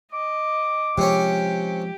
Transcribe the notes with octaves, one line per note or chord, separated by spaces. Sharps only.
D#5 D6
C3 F3 G#3 C#4 G4